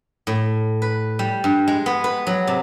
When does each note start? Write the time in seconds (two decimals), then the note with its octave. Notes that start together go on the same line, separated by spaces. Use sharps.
0.27 A2
0.82 B4
1.19 G3
1.44 G2
1.68 G#3
1.86 B3
2.04 B4
2.27 F#3
2.47 C3